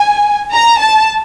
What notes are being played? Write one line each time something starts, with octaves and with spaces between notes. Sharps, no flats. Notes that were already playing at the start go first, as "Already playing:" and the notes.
Already playing: G#5
A#5
A5